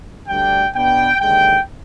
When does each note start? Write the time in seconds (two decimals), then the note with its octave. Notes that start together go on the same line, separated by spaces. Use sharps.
0.29 D2 D3 G3 D4 G5
0.75 B2 B3 D4 G5
1.20 D#2 D3 G#3 G5